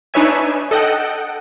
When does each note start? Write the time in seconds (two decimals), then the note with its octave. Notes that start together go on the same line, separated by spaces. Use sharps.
0.14 D4 D#4 B4 C#5 E5 G#5
0.71 A4 D#5 F#5 G5